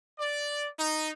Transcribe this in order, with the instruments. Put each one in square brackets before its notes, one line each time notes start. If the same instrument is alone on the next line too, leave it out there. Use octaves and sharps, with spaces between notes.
[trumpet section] D5
D#4